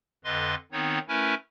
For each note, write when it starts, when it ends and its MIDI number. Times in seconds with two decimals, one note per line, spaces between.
0.24 0.55 41
0.24 0.55 50
0.24 0.55 71
0.24 0.55 75
0.24 0.55 84
0.72 0.99 51
0.72 0.99 59
0.72 0.99 60
0.72 0.99 63
0.72 0.99 73
1.08 1.34 57
1.08 1.34 61
1.08 1.34 64
1.08 1.34 70
1.08 1.34 71
1.08 1.34 80